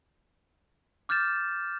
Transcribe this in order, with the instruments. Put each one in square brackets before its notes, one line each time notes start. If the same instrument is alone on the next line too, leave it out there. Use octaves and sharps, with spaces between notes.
[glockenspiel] D6 F6 G6 A6 E7